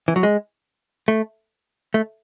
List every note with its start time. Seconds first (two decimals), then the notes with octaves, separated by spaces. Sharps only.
0.08 E3
0.16 F#3
0.23 G#3
1.08 A3
1.94 A3